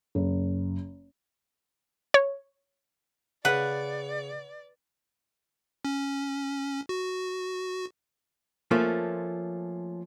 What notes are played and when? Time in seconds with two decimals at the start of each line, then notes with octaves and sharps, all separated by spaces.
0.15 F#1
2.14 C#5
3.45 C#3 B4 D5 F#5
5.85 C#4
6.89 F#4
8.71 F3 A3 A#3 C#4 F4